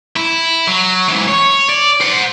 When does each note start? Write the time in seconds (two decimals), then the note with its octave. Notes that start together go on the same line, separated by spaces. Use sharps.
0.16 E4
0.68 F#3
1.08 G#2 E3
1.28 C#5
1.69 D5
2.01 C5 F#5